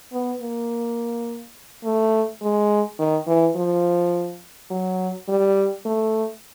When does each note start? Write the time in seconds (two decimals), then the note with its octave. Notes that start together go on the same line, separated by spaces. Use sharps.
0.13 B3
0.41 A#3
1.84 A3
2.41 G#3
2.99 D#3
3.27 E3
3.56 F3
4.71 F#3
5.29 G3
5.85 A3